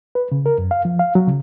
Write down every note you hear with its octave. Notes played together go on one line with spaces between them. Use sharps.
B4
C#3
A#4
F#2
F5
F3
F5
F#3
C#3